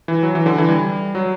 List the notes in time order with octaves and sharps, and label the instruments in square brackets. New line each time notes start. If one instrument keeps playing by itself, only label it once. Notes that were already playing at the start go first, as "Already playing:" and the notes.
[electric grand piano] E3
F#3
E3
D3
E3
G3
F#3